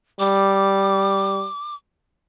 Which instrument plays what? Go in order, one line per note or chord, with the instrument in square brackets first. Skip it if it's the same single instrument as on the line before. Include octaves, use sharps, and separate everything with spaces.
[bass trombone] G3 [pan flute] D6